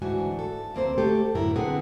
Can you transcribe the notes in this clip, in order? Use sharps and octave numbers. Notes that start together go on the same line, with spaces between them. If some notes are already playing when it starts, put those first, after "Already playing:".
D2 G#2 E3 D4 F#4 G#5
A4
D2 A#3 C4 C5
A3 G4 A4
F#2 A2 D3 E4 A#4
D3 C4 G#4 B4 F#5